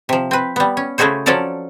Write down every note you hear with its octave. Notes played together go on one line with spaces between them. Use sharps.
C3 F3
C4 B4
G3 B3
C#4
C#3 A3 E4 F#4 G#4 C5
F3 F#3 C#4 A4 D5 A#5